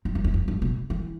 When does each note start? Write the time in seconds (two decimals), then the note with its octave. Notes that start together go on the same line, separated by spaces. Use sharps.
0.05 G2
0.15 F#2
0.24 E2
0.34 F#2
0.48 G2
0.62 B2
0.90 E3